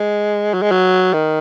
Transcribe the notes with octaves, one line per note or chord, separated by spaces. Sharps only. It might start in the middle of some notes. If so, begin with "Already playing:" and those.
Already playing: G#3
F#3
G#3
F#3
D#3